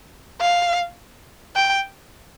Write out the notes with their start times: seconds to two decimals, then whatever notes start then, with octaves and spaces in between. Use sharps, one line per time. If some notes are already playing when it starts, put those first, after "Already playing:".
0.41 F5
1.56 G5